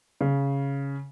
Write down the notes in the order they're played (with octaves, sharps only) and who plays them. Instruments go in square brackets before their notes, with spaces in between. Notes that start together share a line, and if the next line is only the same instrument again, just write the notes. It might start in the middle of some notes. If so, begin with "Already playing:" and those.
[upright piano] C#3